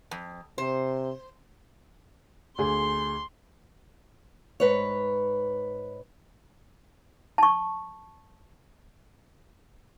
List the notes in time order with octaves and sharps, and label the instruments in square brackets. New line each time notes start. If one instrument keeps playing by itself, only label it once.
[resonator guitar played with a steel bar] F2
[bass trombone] C3 [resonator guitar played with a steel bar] C5
[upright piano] D2 G#4 [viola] C6
[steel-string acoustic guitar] G#2 B4 C#5
[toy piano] A5 C#6